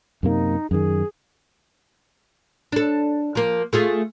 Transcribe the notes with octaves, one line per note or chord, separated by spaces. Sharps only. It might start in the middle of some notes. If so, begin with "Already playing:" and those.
F#2 C3 A#3 D#4
F#2 D#3 G#4
D4 A4
F3 A#3
A3 F4 G#4